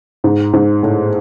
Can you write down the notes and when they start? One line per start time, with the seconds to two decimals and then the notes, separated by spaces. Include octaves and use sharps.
0.24 G#2
0.53 G#2
0.83 A2